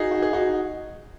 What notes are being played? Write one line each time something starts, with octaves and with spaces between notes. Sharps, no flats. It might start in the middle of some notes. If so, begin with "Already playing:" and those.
Already playing: D#4 F#4 G#4
F#4
G#4
D#4 F#4